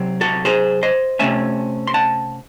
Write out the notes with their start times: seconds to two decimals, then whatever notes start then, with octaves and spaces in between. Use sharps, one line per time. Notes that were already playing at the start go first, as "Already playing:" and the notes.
Already playing: C3 F#3 C4
0.21 F#4 A4
0.45 G#4 C5
0.83 C5 D#5
1.19 C3 F#3 A3 C#4 E5 G#5
1.87 C6
1.94 F#5 A5